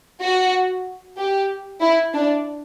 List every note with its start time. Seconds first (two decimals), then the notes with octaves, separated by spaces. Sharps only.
0.21 F#4
1.18 G4
1.82 E4
2.14 D4